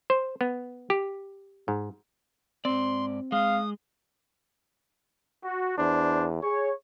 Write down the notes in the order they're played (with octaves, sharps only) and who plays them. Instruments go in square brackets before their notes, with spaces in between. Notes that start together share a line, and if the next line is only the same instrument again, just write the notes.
[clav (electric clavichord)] C5
B3
G4
G#2
[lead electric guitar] G#2 D5 [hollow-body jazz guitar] C4 [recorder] C6
[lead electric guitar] G#3 [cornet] F5 [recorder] D#6
[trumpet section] F#4
[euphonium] E2 [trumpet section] D4 C5
[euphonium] G#4 [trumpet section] C#5